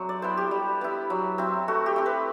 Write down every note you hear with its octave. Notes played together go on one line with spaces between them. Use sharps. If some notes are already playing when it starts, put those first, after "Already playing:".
Already playing: F#3 A3 C4 D4
D5
B3 E4 C5
G4
G3
B3 E4
F#3
C4 E4
A3 F#4
G4
C4 E4
B4